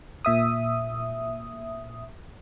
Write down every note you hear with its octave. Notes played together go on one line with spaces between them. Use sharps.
A#2 E5 D#6